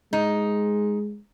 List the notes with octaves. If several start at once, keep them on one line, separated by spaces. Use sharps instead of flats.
G#3 D#4